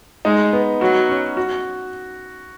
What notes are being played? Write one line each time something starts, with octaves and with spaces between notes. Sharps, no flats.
G#3 D#4
B3
F#3 F#4
C#4
F#4